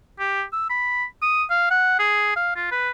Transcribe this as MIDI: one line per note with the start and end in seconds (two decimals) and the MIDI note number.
0.19 0.44 67
0.53 0.66 88
0.70 1.04 83
1.22 1.44 87
1.50 1.68 77
1.71 1.97 78
1.99 2.33 68
2.36 2.56 77
2.56 2.71 65
2.72 2.90 71